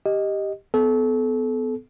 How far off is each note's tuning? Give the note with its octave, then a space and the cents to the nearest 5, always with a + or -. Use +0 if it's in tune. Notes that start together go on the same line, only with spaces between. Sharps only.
G4 +0 D#5 +0
B3 +30 A4 -30